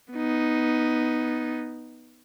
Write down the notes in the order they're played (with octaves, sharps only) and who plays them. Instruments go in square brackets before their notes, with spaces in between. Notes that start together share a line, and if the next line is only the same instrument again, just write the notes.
[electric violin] B3 D#4